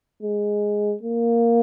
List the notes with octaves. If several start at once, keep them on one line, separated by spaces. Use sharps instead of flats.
G#3
A#3